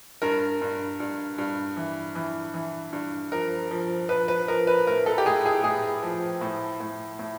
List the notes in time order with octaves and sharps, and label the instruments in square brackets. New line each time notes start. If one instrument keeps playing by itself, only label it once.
[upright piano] G2 A#4
G2
G2
G2
E3
E3
E3
G2
F3 A#4
F3
F3 B4
B4
F3 A#4
B4
A2 A#4
A4
G4
A2 G#4
G#4
A2 G#4
F3
A2
A2
A2